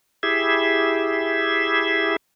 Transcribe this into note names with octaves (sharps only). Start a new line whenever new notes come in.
E4 G4 G#4 E5